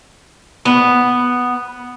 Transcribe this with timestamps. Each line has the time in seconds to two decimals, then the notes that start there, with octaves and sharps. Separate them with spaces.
0.65 B3